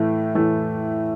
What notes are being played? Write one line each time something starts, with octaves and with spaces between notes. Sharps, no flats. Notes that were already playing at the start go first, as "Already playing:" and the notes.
Already playing: A2 E3 A3
A2 E3 A3